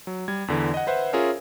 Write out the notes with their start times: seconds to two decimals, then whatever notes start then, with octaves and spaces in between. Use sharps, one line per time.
0.07 F#3
0.28 G3 G#6
0.48 E2 D3 E3
0.74 D#5 F#5
0.87 B4 C5 E5 F#5
1.13 C#4 F4 G#4 A#4 C#5 E5